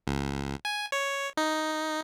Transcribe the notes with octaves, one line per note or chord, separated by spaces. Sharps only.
C#2
G#5
C#5
D#4